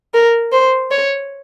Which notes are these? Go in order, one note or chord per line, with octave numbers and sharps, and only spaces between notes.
A#4
C5
C#5